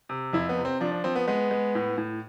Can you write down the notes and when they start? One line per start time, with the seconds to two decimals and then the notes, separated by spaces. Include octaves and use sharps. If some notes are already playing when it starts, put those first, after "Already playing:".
0.09 C3
0.33 F2 E4
0.49 B3
0.57 C3
0.65 C4
0.80 F3 D4
0.92 D4
1.04 F3 C4
1.16 B3
1.28 G#3 B3
1.51 G#3
1.75 A2
1.98 A2